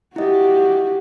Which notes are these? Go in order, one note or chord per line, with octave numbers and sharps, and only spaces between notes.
E4 F#4 G4 D#5